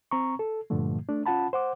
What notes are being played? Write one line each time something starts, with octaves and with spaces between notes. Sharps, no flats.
C4 A#5 C#6
A4
G2 A#2 D3 F3 A3
A3 D4
C#4 F4 F#5 A5 B5
C5 F#5 D6